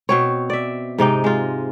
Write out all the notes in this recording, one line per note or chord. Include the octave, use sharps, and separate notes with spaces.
B2 C4 C#5
D5 E5
G#2 C3 D#4 G5
G#3 F4